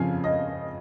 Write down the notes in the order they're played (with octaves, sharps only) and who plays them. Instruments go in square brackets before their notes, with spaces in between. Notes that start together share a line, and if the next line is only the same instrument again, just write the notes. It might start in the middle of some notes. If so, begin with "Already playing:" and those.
Already playing: [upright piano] F2 C#3 F3 F5 G#5
D#5